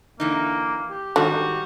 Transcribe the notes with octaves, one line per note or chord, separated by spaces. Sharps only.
D3 E3 A#3 D#4
G4
G#2 D3 D#3 G3 F#4